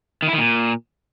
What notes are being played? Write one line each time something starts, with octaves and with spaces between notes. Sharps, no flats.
D#3
E4
D#3
A#2